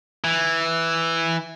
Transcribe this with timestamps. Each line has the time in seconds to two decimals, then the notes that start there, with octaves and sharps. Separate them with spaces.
0.24 E3